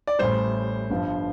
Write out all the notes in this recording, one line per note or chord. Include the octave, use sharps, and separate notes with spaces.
D5
A1 A2 G3 C5
G1 G2 F3